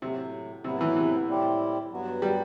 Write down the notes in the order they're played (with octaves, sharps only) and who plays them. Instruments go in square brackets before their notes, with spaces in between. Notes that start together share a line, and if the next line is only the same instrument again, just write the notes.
[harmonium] A2 F#3 A3 [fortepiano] C3
[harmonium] A2 F#3 B3 E4 [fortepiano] C3
[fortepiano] E3
C3
[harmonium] A2 G3 C4 E4 G4
G2 F#3 B3 F#4
[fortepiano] G3